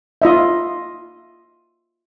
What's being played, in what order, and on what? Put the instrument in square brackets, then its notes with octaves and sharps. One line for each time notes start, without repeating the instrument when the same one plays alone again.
[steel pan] F4 D#5 E5